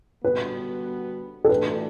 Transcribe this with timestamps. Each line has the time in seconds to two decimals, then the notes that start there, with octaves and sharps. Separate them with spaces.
0.23 D3 G3 B3 F#4 B4
1.45 A4
1.49 E3 A3 D4 F#4 B4